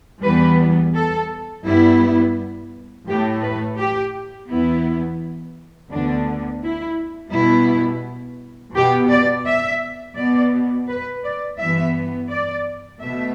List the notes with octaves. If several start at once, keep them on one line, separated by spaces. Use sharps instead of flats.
E2 E3 G3 B3 B4
A4
G2 G3 B3 E4
A2 A3 G4
B4
G4
E2 E3 B3 E4
D2 D3 B3 D4
E4
B2 G3 B3 E4
B2 B3 G4
D5
E5
B2 B3 D5
B4
D5
G2 E3 B3 E5
D5
B2 A3 E5